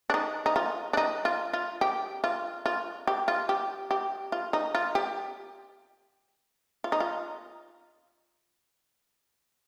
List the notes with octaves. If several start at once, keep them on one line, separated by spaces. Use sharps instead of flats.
D4
D#4
D#4
F4
D4
D#4
F4
F4
G4
F4
F4
G4
F4
G4
G4
F4
D#4
F4
G4
F4
D#4
F4